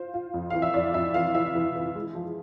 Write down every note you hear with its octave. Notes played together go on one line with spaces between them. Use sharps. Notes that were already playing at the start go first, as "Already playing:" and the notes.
Already playing: F4 C5
F4
F2
E3 F5
E5
F2 D5
F2 E5
E3 F5
E3 E5
E3
E3
G#3
F3